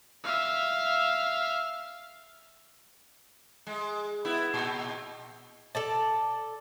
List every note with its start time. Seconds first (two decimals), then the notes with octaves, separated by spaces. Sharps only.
0.24 E5 F5
3.67 G#3
4.25 B3 E4
4.54 A#2
5.75 A4 D5 A5